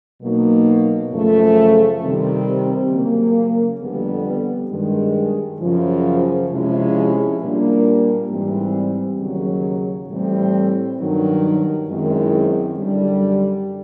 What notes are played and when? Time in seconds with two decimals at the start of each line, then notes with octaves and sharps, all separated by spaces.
0.21 B2 F#3 A#3 D#4
1.10 F#2 C#3 F3 A3
2.01 C3 D#3 G3 C4
2.90 C#3 F#3 A#3
3.80 F2 D3 G3 B3
4.70 G2 D#3 G#3
5.60 F#2 C#3 F3
6.49 C3 F3 G#3 C#4 E4
7.39 A#2 G3 A#3 D4
8.29 G#2 E3 G3 C4
9.19 D#2 C#3 F#3
10.08 A2 E3 G3 C4
10.97 G2 D#3 F#3
11.88 F#2 D#3 G#3 C4 E4
12.77 F#2 D3 G3